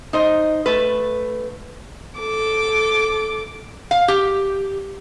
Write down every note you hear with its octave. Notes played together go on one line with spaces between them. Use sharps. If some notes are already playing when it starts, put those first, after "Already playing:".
D#4 C5 D#5
A3 B4
A4 D6
F5
G4